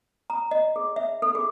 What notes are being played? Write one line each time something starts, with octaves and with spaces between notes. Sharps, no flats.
A#5
D#5
G#4
E5
A4
G#4